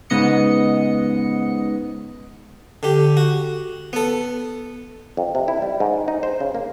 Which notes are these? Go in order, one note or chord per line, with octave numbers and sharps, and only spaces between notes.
G#2 C#3 B3 D#5 C#7
D3 G4
F#4
B3 A4
F2
C3
E4
G3
G#2
D#4
C5
C#3
A#3